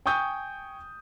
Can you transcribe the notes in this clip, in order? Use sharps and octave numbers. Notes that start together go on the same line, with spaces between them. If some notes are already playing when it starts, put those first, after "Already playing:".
G5 G#5 C#6 D#6 G6